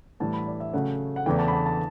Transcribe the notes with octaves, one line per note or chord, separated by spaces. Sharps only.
A2 E3 G3 A5
B5
D5
E5
C#3 F#3 A3 C#4 F#5
F#5
E2 C#3 E3 A3 G5
A5
B5
A5
A5